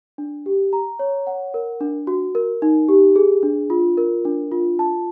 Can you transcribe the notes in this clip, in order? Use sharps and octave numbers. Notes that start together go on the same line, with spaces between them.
D4
G4
A#5
C#5
F#5
A#4
D4
F#4
A#4
D#4
G4
G#4
D4
F4
A#4
D4
F4
A5